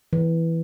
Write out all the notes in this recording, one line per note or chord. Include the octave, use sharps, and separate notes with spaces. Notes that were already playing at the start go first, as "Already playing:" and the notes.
E3